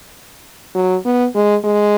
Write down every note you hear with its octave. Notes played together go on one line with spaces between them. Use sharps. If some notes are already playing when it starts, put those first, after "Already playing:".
F#3
B3
G#3
G#3